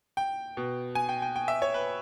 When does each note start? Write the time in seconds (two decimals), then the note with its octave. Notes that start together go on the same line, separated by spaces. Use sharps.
0.17 G5
0.57 B2
0.95 G#5
1.09 G5
1.22 G5
1.36 G5
1.48 E5
1.62 C#5
1.74 B4